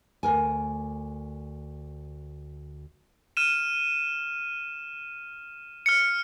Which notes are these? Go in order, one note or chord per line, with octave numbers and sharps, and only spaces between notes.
D2 A#4 G#5
F6 D#7 E7
F6 C#7